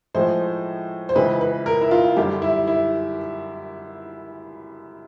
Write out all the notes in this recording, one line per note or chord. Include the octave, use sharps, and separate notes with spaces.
A2 F3 G#3 C5
C5
C#2 C#3 E3 B4
B4
A#4
E4
F4
F#2 D3 G3 G4
E4
E4